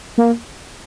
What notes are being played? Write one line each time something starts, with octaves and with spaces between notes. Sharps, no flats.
A#3